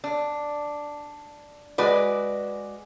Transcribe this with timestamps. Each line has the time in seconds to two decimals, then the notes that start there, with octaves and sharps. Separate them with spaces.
0.04 D4
1.78 G#3 F#4 B4 D5